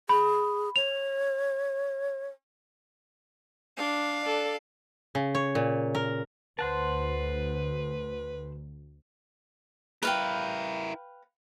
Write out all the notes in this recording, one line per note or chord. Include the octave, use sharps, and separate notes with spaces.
G#4 B5
C#5 F7
D4 F5
A4 D5
C#3
C#5
A#2
A#4
D2 B4 C5 F#5 A5
E4 A#4 B4 F5 G5